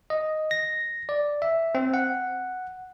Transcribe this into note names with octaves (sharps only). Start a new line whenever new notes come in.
D#5
A#6
D5
E5
C4
F#5